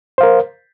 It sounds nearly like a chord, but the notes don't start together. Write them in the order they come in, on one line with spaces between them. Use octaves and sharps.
C5 F5 A#4